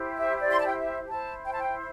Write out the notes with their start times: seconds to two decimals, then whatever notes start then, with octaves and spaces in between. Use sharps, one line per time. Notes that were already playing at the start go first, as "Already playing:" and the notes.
Already playing: E4 G4 C5
0.17 E5
0.40 D5
0.51 C6
0.59 A5
0.67 G5
0.75 E5
1.09 E4 C5 A5
1.45 G5
1.53 A5
1.61 G5